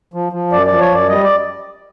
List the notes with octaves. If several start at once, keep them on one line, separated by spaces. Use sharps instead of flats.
F3
F3
F#2 D5
F3 D5
C#5
F#2 D5
G3 D#5
D5